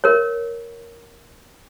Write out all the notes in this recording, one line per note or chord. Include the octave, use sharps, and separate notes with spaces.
A#4 C#5